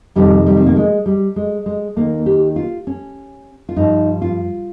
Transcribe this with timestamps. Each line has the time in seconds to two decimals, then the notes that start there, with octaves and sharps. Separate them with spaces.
0.15 F2 C3 D#3 G3
0.47 G3
0.57 C4
0.66 A#3
0.76 G#3
1.06 G3
1.36 G#3
1.66 G#3
1.96 D#2 D#3 A#3
2.26 G4
2.56 F4
2.87 C#4
3.69 F4
3.76 G2 F3 D#4
4.22 F4